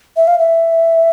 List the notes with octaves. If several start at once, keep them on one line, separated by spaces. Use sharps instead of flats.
E5
F5
E5